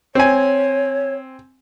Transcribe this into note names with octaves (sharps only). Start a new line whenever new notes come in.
C4 C#5 G#5